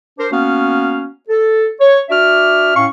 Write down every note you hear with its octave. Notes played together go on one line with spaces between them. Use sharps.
D4 A#4 C5
A#3 B3 C#4 F#4 F5
A4
C#5
D4 F#4 D5 E5 F6
A2 C#4 F5 C#6